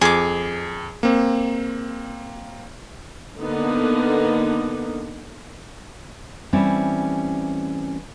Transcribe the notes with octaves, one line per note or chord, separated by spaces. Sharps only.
F2 G#4 D6
A#3 C4
D3 A#3 B3 D#4
E3 G3 A3 C4 C#4 E4